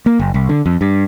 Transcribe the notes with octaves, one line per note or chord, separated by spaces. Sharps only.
A#3
F#1
C2
D3
F2
G2